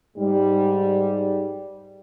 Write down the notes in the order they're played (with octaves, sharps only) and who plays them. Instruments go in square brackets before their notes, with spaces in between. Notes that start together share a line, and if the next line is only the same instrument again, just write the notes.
[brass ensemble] G#2 G3